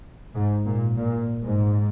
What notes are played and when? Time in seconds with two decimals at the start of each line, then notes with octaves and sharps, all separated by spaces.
0.35 G#2
0.65 A#2
0.96 A#2
1.42 G#2